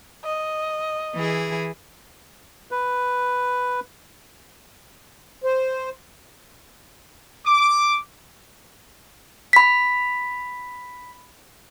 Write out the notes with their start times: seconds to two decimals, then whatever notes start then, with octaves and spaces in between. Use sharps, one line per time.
0.24 D#5
1.16 E3 E4 G#4
2.71 B4
5.44 C5
7.45 D6
9.53 B5 B6